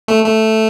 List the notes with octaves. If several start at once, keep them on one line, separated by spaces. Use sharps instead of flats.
A3
A3